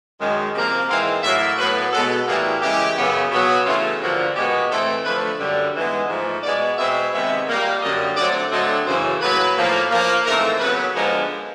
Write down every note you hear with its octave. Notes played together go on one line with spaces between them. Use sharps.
F#2 D#3 G#3
C3 F3 A#3
G#2 E3 G#3 C4 F5
A2 F#3 A#3 E5
A2 F#3 B3 B4
B2 G#3 B3 A4
A2 E3 G3 A#3 G#4
C#3 E3 G#3 G4
F#2 C#3 F#3 B3
B2 F#3 B3
C#3 E3 A3 F4
G2 D3 F3 A#3 F#4
B2 G#3 B3 G4
A2 E3 A3 C4 A4
D3 F3 A3 B4
F#2 D3 G3
G#2 E3 G#3 B3
G#2 F3 A3
B2 G#3 B3 D5
B2 G#3 C4 E5
C3 D#3 G#3 B3 E5
A#2 G3 A#3
F#2 D3 G3 D#5
D3 F#3 A3 C4 D5
D3 F#3 A3 C4 D#5
F#2 C#3 E3 C5
A2 F#3 A#3 B4
A2 F3 A#3
A#2 F3 A#3
G#2 E3 A3 C4 A#4
C#3 F#3 B3 B4
D3 F3 G#3 B3 A#4